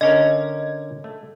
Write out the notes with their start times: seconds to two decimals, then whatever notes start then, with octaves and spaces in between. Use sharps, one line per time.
0.01 D3 C#4 A#4 D#5 G#6
1.04 A3